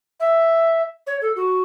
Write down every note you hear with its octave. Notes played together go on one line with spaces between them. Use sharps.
E5
C#5
A4
F#4